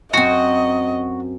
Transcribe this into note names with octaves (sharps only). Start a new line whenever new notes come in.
F#2 C4 F#4 D#5